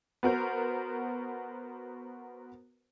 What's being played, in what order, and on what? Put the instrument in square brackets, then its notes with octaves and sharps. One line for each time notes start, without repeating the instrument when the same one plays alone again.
[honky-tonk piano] B3 F#4 A#4 C5